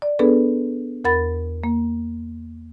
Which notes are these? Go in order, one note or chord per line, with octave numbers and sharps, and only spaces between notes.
D5
B3 D4 G#4 A4 B4
E2 A#4 F#5 B5 A6
A#3